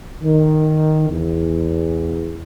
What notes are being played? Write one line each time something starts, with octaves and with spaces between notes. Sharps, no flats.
D#3
E2